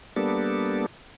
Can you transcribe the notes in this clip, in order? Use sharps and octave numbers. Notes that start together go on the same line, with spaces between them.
G3 A#3 B3 D4 A4